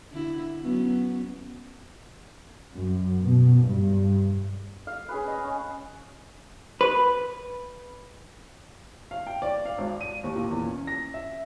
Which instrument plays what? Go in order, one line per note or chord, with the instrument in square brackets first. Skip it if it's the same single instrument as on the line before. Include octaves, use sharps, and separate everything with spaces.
[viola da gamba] D3 E4
F#3 B3 C#4
[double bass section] F#2
B2
G2
[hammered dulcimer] F5
C#4 G#4 B4
D#5
C#4
[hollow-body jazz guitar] B4
[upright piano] F5
G5
D5
F5
G#1
D#7
D#2
A#2
E2
C#4
A#6
E5